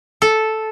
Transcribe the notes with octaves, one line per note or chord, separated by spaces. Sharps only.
A4